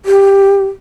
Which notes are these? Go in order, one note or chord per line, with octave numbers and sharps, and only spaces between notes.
G4